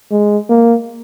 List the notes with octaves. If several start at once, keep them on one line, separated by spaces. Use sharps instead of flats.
G#3
A#3